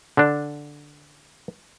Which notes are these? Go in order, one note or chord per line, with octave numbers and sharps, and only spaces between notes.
D3 D4